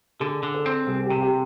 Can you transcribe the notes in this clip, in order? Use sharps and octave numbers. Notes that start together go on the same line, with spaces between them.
D3 G#4
D3
A4
C4
C2 G#4
G4
C3
G4